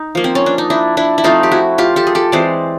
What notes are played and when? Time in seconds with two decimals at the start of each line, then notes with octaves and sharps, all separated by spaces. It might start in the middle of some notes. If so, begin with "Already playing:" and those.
Already playing: D#4
0.15 F3 A#3
0.24 C4
0.35 C#4
0.46 D4
0.58 D#4
0.70 D4 E4
0.97 D4 E4
1.18 E4
1.24 F3 A3 C4 D#4 F4
1.43 G4
1.52 E4 F#4
1.78 F4 G4
1.96 G4 A4
2.07 G#4
2.15 G4 A4
2.32 E3 G#3 C4 C5 D5